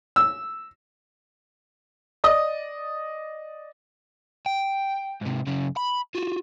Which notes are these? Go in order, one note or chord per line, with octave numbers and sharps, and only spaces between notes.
E6
D5 D#5 D#6
G5
G#2 C3
F#2 C#3
B5
F4 F#4